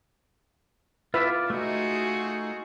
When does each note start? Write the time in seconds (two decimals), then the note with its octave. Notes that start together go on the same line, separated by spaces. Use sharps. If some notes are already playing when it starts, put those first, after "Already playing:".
1.14 F4 B4 D5 E5
1.50 A3 D#4 F4 F#4 G#4